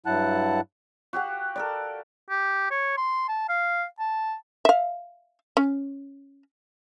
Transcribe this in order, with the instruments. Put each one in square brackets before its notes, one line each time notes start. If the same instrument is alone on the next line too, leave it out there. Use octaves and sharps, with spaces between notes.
[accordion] G2 F#3 E4 F#5 A5 F#6
[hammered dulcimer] F#4 G4 F5 F#5
A4 A#4 D5
[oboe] G4
C#5
C6
A5
F5
A5
[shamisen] E5 F5
C#4